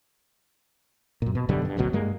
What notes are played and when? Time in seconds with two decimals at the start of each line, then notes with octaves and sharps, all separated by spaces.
1.22 F#2 A#2
1.35 B2
1.49 F#2 B2 D3 G3
1.65 G2
1.77 A1 D2 B2 F#3
1.93 G2 G#3 A#3